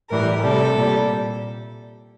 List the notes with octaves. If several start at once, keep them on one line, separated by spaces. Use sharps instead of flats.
A2 E3 G3 A#4
C3 G3 A4
A#2 G3